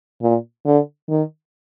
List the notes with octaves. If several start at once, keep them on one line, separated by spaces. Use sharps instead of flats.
A#2
D3
D#3